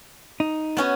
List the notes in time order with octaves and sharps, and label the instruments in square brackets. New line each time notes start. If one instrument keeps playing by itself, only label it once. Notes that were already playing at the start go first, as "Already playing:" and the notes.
[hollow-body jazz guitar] D#4
[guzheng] B3 C#4 F#4